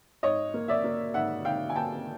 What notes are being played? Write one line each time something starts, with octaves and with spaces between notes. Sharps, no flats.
G#2 C#5 D#5
A#3
D5 E5
A#3
G#2 E5 F#5
G#2 F5 G5
G#5
A#3 G5 A5